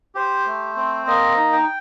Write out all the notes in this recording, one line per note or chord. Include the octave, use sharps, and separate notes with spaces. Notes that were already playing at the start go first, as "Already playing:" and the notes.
G4 C5
A3
C4
A#3 D#5
D#4
G5